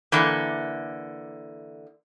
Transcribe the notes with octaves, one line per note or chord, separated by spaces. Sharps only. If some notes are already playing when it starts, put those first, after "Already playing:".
D3 E3 A#3